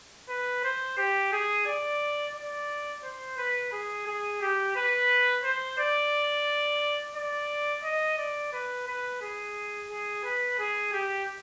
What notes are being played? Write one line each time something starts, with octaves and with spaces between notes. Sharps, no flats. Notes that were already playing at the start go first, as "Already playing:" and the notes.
B4
C5
G4
G#4
D5
D5
C5
B4
G#4
G#4
G4
B4
C5
D5
D5
D#5
D5
B4
B4
G#4
G#4
B4
G#4
G4